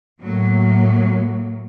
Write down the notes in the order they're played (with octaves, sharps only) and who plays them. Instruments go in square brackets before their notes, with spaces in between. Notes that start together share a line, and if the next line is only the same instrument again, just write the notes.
[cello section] A2 F#3 A#3